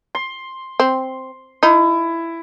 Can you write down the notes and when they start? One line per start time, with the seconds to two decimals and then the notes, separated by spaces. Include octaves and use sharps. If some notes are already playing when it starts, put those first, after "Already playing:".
0.15 C6
0.80 C4
1.63 D#4 E4